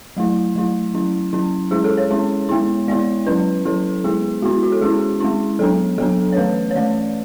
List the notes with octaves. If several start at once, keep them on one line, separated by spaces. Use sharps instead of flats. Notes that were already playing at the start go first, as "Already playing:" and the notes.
F#3 A3 E4
F#3 A3 E4
F#3 C#4 E4
F#3 C#4 E4
G#3 C#4 E4 G#4
A4
C#5
G#3 C#4 E4
G#3 B3 E4
G#3 B3 E4 D5
F#3 C#4 E4 B4
F#3 C#4 E4 A4
G#3 B3 E4 G#4
G#3 B3 E4 F#4
E4
F#4
A4
G#3 C#4 E4 G#4
G#3 C#4 E4
F#3 B3 D4 A4
F#3 B3 D4 A4
C#5
E3 A3 C#4 B4
C#5
E3 A3 C#4 D5